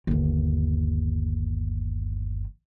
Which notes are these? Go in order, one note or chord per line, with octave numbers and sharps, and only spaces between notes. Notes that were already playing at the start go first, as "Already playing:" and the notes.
G1 D#2